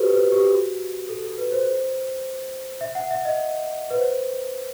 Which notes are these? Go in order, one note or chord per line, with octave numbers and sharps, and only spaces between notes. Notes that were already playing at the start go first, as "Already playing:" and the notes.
Already playing: F#4 G4 A4 B4 C5
B4
G4
F#4
A4
A4
B4
C5
E5
F#5
E5
D#5
B4
C5